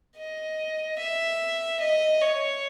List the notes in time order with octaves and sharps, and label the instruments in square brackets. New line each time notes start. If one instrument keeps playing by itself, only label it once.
[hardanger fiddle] D#5
E5
D#5
C#5